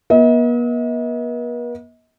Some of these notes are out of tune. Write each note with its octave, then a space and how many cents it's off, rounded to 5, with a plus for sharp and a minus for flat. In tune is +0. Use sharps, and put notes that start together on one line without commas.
B3 -45 D#5 +45